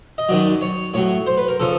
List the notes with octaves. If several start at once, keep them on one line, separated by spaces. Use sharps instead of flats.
D#5
F#2 D#3 F#3 D5
C#5
A2 F#3 C#5
C5
B4
A#4
C#3 F3 A4